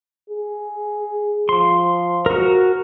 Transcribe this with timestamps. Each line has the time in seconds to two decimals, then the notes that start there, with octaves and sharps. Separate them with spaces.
0.30 G#4
1.49 F3 C6
2.26 F#4 A#4